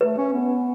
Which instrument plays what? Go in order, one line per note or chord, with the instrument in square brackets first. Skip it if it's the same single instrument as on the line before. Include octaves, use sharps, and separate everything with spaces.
[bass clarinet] A3 [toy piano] B4
[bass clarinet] C#4
B3